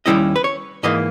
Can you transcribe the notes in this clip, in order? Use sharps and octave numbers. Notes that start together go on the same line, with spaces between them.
D#2 C#3 G3 C#4 E4 D#5
B4
C#5
G#2 E3 A#3 D#5